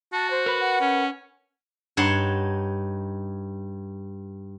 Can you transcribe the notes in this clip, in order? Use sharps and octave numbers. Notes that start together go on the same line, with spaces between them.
F#4 A5
C5
A#4 B4
F#5
C#4
G2 D#4 C#5 F#5 A5 C6